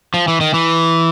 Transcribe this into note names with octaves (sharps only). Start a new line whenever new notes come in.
F3
E3
D#3
E3